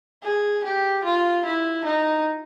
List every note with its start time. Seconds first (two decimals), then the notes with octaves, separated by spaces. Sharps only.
0.23 G#4
0.64 G4
1.04 F4
1.45 E4
1.85 D#4